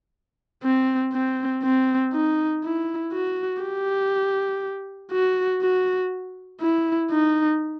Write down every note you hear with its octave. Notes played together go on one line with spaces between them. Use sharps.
C4
C4
C4
D#4
E4
F#4
G4
F#4
F#4
E4
D#4